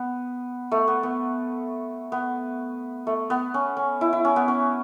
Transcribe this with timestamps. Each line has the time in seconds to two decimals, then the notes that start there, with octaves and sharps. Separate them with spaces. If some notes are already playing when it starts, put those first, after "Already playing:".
Already playing: B3
0.72 A3
0.88 B3
1.03 B3
2.12 B3
3.07 A3
3.30 B3
3.54 C#4
3.77 C#4
4.01 E4
4.13 E4
4.25 C#4
4.36 B3
4.48 C#4